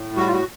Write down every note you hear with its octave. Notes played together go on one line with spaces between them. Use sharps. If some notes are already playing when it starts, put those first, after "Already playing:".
Already playing: A2
G3 F#4
F4
F#4